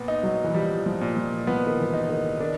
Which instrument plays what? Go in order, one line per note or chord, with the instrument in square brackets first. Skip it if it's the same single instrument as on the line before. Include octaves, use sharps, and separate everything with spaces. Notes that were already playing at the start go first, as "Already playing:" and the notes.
Already playing: [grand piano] A#2 B3
D#4
[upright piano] F#3
E3
[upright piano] F3 [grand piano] G3
[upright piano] F3
[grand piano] A#2
[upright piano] F3
[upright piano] F3 [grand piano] B3
[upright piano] D#3
E3
[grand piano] D#4
[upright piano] D#3
[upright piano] D#3 [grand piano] D4